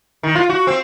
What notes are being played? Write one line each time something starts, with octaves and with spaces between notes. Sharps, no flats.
D#3
F4
F#4
C4